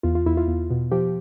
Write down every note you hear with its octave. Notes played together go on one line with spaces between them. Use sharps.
E2 F4
F4
E2 E4
F4
E2
B2
F3 G4